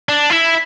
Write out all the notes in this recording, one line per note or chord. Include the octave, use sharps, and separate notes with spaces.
D4
E4